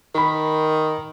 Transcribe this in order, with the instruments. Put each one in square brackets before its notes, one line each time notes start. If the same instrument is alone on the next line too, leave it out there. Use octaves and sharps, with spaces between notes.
[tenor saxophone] D#3 [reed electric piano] A#4 B5